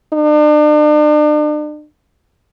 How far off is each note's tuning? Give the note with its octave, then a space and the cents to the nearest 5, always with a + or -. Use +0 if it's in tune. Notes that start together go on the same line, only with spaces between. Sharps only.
D4 +40